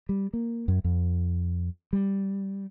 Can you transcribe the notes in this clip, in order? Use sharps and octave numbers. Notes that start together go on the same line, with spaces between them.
G3
A#3
F#2
F2
G3